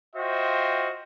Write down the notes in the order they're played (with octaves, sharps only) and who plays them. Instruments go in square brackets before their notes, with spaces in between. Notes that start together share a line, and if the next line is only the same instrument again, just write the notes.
[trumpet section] F4 F#4 C5 D#5 E5 G5